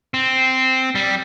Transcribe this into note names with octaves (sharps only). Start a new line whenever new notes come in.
C4
G3